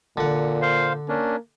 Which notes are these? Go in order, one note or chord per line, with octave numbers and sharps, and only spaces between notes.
A#2 D3 F#5
C5 F5
A#3 C#4 D4